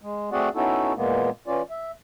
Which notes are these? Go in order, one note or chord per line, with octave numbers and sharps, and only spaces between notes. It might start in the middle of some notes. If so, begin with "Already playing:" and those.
G#3
A3 C4 F#4 G#4 D5 F#5
B3 C#4 D#4 E4 F#4 A4
A#2 E3 G#3 A#3 B3
E3 C#4 F4 D5
E5